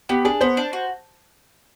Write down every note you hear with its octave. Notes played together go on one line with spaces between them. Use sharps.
B3 G4
D4 G#4
B3 C5
D4
F#4